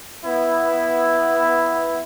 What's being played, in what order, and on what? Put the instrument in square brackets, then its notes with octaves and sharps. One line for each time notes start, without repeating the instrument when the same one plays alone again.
[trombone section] B3 E4